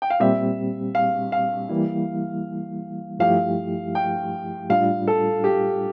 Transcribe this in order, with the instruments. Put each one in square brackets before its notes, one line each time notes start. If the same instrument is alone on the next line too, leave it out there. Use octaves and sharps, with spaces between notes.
[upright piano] G5
F5
[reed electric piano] A#2 G3 C4 G4 [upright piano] E5
[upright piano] F5
F5
[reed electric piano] E3 G3 A#3 E4
[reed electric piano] G2 F3 A3 E4 G4 [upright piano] F5
[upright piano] G5
[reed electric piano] A2 G3 D4 F4 [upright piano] F5
[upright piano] A4
G4